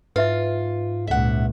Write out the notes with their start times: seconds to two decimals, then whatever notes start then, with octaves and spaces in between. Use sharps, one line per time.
0.16 G#2 F4 B4 E5
1.07 C#2 A#2 E5 F#5